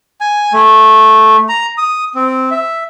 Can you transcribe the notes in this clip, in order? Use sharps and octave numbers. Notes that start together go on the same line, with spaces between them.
G#5
A3
A#5
D#6
C4
E5